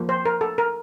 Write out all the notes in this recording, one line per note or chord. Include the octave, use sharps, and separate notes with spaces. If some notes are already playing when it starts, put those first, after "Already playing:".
Already playing: F3 A#3
C5
A#4
A4
A#4